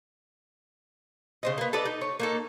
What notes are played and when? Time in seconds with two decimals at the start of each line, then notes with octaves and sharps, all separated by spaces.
1.43 C#3 C5 D#5
1.58 A#3 B3
1.73 A4 B4 D5 D#5
1.85 D#4
2.01 C#5
2.20 A#3 D#4 A4